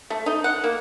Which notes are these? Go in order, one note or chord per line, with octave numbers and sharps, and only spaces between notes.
A3
D#4
F#5
A#3